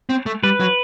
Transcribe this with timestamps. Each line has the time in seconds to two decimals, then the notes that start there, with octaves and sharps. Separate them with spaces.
0.09 C4
0.26 A3
0.43 G3 B4
0.60 F#3